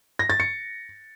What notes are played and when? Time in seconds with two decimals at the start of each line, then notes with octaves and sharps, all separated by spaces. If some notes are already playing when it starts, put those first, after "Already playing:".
0.19 A#6
0.30 A6
0.40 C#7